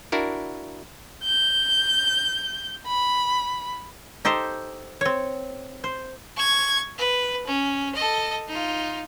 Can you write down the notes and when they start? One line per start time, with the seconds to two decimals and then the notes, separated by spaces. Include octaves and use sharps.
0.12 D4 E4 F#4 A#4
1.24 G6
2.87 B5
4.25 D#4 G4 A4 C5
5.01 C4 C#5
5.84 C5
6.36 C#6 G#6
6.98 B4
7.47 C#4
7.95 A4 D#5
8.47 D#4 F4